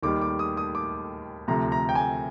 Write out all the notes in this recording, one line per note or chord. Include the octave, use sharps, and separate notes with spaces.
D#2 D#3 G3 D6
D6
D#6
D#6
D6
D2 C3 F3 A#5
A#5
G5
G#5